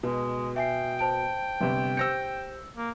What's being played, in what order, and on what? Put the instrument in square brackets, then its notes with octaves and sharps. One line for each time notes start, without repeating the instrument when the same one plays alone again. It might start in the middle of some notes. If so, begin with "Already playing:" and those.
[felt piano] B2 [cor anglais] G#3
[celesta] E5 G#5 C7 [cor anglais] G5
[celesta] C5 A5 D7
[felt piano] G1 C3
[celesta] G4 C5 G6 [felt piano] E6 A#6 C#7
[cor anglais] A#3